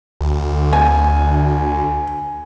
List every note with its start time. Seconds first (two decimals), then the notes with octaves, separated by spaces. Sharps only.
0.21 D2
0.73 G#5